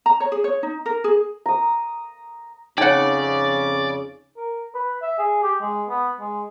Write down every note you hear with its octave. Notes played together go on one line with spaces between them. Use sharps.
A#5
C#5
G#4
C#5
D#4
A#4
G#4
A#5 D#6
F2 C#3 D#4 C#5 D5 F#5 G5
A#4
B4
E5
G#4
G4
G#3
B3
G#3